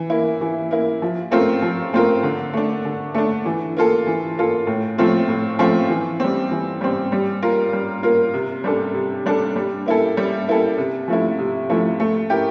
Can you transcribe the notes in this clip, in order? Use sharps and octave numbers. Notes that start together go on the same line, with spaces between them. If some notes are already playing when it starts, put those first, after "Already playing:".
Already playing: E3
A#3 E4
E3
A#3 E4
F3
A3 C4 F4 A#4
F3
A3 C4 F4 A#4
D3
A3 D4
D3
A3 D4
E3
A#3 F4 A4
E3
A#3 F4 A4
A2
F3 A3 C4 F4
A2
F3 A3 C4 F4
E3
G3 C4
E3
G3 C4
G3
A#3 F4 A#4
G3
A#3 F4 A#4
C3
G3 D4 A4
C3
G3 D4 A4
G3
A#3 E4 A4
G3
A#3 E4 A4
C3
F3 A3 E4
C3
F3 A3 E4
A3
E4 G4 A#4